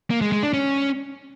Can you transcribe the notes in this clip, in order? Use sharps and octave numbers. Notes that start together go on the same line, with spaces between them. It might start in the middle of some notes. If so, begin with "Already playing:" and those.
A#3
G#3
G#3
D4
C#4